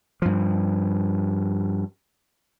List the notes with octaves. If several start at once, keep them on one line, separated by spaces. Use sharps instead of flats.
G2 F3